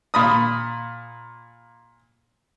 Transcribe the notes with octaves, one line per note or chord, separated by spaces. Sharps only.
A#2 B5 D#6